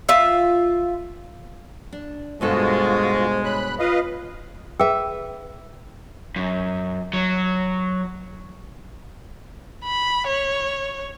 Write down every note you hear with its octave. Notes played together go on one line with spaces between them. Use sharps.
F4 E5
D4
G2 B2 G#3 F4 F#4 A4 C5
C#5 B5 F#6
F4 B4 D#5 F5
G#4 B4 E5 G5 E6
F#2
F#3
B5
C#5